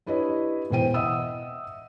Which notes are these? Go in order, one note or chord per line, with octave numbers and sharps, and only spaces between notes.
D4 E4 G4 B4 C#5 D#5
E1 E3 C5 G5 D#7
D#5 E5 F#5 D#6 E6